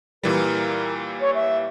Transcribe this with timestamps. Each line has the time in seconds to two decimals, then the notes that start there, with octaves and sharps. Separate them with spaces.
0.23 A#2 E3 G3 A#4
1.20 C#5
1.34 E5